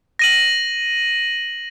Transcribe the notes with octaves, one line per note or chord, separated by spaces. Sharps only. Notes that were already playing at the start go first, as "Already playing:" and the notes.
A#6 D#7 F#7